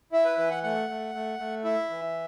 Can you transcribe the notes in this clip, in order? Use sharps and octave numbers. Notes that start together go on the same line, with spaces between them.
E4 E5
B4
E3 B4
F#5
A3 F#5
A3
A3
A3
E4 E5
E3